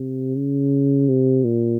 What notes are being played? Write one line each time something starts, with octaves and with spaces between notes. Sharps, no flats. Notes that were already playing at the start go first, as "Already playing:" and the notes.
Already playing: C3
C#3
C3
A#2